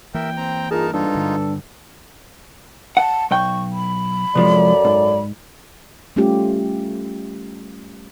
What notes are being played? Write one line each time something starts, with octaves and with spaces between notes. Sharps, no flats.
E3 A#3 A#4 E5 G5
C4 A#5
G2 D#4 F4 G#4 A#4 A5
G#2 G3 D4 D#4 F4 A4 B4
G2 D3
F#5 A5
B1 G5 C#6
B5
F#2 C3 F3 G#3 A4 D5
G#2
G3 A3 C#4 F4 G4